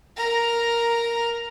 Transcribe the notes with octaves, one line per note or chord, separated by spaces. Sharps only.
A#4 A#5